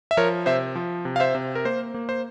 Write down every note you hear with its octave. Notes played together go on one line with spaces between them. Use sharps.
E5
F3 A#4 C#5
C3 C5 E5
F3
C3
F5
C5 E5
C3
A#4
A#3 C5
A#3
C5